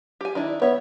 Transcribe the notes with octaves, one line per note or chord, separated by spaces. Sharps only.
G4 G#5
D#3 D4 E4
B3 C#5 E5